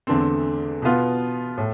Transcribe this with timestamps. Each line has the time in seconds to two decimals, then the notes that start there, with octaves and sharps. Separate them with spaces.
0.07 E2 D3 A3 C4
0.82 B2 B3 F4
1.58 A2